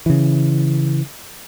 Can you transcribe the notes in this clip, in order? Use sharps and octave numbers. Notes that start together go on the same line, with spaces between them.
C#3 E3